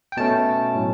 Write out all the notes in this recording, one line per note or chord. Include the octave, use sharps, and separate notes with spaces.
G5
B2 A3 C#4 A5
A2 F#3